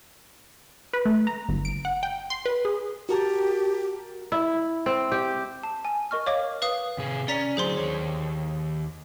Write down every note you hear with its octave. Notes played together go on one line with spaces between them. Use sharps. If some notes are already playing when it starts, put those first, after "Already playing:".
B4
A3
A#5
G1
D7
F#5
G5
C6
B4
G#4
F#4 G4 A#4 A5
E4
C4
G4
A5
G#5
A#4 D#5 C#6 F6
C#5 D#5 F5 D6
B4 F5 D#6
C3 G#4
C#4 D5 A#5 B6
D3 F#3 G#4 C5 C6
D#2 C#5